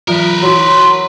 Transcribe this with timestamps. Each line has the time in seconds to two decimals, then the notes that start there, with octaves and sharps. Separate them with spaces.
0.08 E3 F#3 F4 A#4 B4
0.42 F#3 E4 F#4 C6